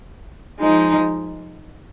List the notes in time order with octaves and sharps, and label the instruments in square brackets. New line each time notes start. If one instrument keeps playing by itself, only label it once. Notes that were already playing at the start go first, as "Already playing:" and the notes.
[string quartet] F3 G#3 D#4